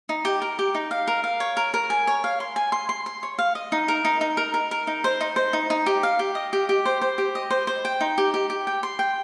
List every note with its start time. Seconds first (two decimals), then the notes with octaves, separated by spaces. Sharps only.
0.09 D#4
0.25 G4
0.42 A#4
0.59 G4
0.75 D#4
0.91 F5
1.08 A#4
1.24 F5
1.40 C#5
1.57 A#4
1.74 A#4
1.90 G#5
2.07 C#5
2.24 F5
2.40 C6
2.56 G#5
2.72 C6
2.89 C6
3.06 C6
3.23 C#5
3.39 F5
3.55 D#5
3.72 D#4
3.88 A#4
4.05 D#4
4.21 D#4
4.37 A#4
4.54 A#4
4.71 A#4
4.87 D#4
5.04 C5
5.21 D#4
5.36 C5
5.53 D#4
5.70 D#4
5.86 G4
6.03 F5
6.19 G4
6.35 D#5
6.53 G4
6.69 G4
6.85 C5
7.01 C5
7.18 G4
7.35 D#5
7.50 C5
7.67 C5
7.85 G5
8.01 D#4
8.18 G4
8.34 G4
8.50 G4
8.67 G5
8.83 C6
8.99 G5